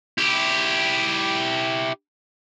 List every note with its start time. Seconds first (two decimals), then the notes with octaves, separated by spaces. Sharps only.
0.18 E4 G4